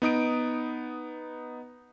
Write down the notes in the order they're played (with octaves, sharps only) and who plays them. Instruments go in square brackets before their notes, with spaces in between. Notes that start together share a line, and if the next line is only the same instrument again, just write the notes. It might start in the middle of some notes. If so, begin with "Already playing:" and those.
[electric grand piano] B3 D#4 D#6 D7